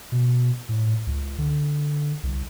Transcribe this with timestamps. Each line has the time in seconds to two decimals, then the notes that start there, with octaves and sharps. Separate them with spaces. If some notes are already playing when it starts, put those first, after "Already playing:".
0.12 B2
0.69 A2
1.07 C#2
1.38 D3
2.23 C2